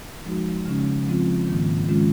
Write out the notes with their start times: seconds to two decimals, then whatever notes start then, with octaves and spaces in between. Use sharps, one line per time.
0.25 F3 G#3 D#4 F#4
0.66 C#3 G#3 C#4
1.07 F3 G#3 C4 F4
1.48 G#2 D#3 A#3
1.88 D#3 G#3 C#4 F4